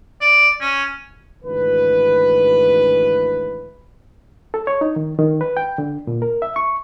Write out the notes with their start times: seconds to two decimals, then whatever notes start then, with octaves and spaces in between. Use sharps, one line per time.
0.21 D5
0.61 C#4
1.44 G#1 D2 E3 B4
4.54 A4
4.67 C#5
4.81 D#4
4.96 D#3
5.19 D#3
5.41 B4
5.57 G5
5.78 D3
6.07 A#2
6.22 A#4
6.42 E5
6.56 C#6